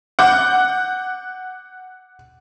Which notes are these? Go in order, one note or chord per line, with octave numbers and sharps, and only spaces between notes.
F#5 D6 G6